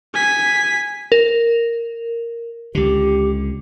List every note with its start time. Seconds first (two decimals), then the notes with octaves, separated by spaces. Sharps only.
0.14 G#5 B6
1.12 A#4
2.75 C#2 D3 G4